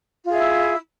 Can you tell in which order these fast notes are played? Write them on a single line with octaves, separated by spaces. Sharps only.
F4 G#4 E5 E4